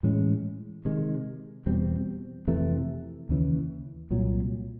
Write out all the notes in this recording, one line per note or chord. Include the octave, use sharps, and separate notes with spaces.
A2 E3 G#3 C#4
C3 D#3 G#3
E2 B2 G3 C4
F2 C3 E3 A3
D#2 C#3 E3
C2 A#2 F#3